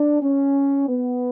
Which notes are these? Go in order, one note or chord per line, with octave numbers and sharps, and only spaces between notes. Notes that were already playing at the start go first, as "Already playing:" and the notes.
Already playing: D4
C#4
B3